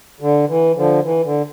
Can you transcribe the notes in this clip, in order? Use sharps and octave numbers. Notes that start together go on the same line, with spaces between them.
D3
E3
D3 F3
E3
D3